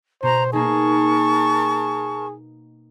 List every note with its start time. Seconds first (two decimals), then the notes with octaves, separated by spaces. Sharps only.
0.23 B2 C5 A#5
0.53 A#3 D#4 G#4 A#4 A5 C#6